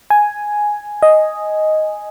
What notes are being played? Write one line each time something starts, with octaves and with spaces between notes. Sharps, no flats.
G#5
D#5